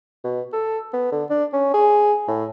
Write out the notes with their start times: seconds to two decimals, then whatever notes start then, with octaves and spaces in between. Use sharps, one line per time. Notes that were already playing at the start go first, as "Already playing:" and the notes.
0.24 B2
0.53 A4
0.93 B3
1.12 D3
1.30 D4
1.53 C#4
1.74 G#4
2.28 A2